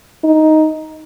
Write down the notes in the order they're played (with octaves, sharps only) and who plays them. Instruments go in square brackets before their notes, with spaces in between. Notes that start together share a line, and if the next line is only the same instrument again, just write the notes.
[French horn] D#4